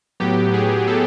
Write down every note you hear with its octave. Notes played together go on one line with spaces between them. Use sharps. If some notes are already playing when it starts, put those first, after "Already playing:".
A2 F#3 B3 G4
G#4
A4